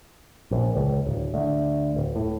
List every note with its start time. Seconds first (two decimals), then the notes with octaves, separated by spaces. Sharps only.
0.51 A#1
0.76 C#2
1.06 D1
1.34 D2
1.96 D1
2.16 A2